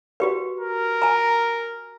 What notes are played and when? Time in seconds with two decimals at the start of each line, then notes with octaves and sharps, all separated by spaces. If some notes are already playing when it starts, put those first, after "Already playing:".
0.20 F#4 G4 B4
0.60 A#4
1.02 G#5 A#5